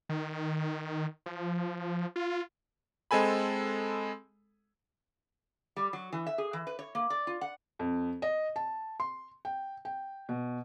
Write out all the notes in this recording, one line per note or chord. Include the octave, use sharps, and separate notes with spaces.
D#3
F3
F4
G#3 C4 A4 G#5 B5
G3
F#3
E3
E5
G#4
E3
B4
C#5
A#3
D5
F4
F#5
F2
D#5
A5
C6
G5
G5
B2